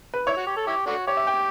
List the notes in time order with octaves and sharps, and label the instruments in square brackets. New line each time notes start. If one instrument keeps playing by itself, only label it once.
[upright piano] B4
[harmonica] E4 [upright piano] C#5
[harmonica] F#4
G4
A4
E4 G4
A3 D4 F#4
[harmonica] G4 [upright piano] C#5
[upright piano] E5
G5